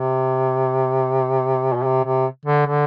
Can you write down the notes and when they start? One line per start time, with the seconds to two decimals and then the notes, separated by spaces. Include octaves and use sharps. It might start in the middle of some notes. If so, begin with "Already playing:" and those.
Already playing: C3
1.74 B2
1.85 C3
2.05 C3
2.46 D3
2.66 D3